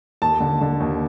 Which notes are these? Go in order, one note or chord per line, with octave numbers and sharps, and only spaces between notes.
D#2 A5
D3
D3
D#2